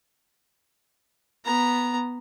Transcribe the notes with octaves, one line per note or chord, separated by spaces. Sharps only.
B3 A#5